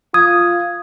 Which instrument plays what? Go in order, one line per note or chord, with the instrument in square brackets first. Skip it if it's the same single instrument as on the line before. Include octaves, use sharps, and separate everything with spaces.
[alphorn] F4 [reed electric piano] D#6 [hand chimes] G#6